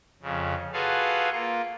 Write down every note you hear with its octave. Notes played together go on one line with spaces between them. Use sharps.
F2 C#3
F4 F#4 G#4 A4 B4 F5
A#3 F4